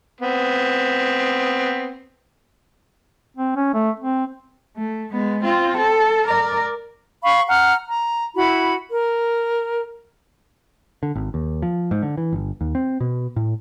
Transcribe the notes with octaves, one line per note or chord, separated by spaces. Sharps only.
B3 C4
C4
C#4
A3
C4
A3
G#3 B3
C4 F4
A4
A#4 D5
F5 B5 C#6
F#5 A#5 F6
A#5
E4 F#4 B5
A#4
D3
G#1
D#2
F3
G#2
D3
E3
G1
D#2
C4
B2
A2